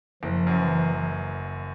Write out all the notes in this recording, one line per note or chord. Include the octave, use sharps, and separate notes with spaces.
F#1 F3
F#2
E3